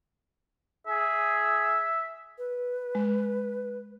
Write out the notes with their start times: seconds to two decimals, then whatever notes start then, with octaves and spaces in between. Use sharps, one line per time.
0.87 G#4 E5
2.38 B4
2.95 G#3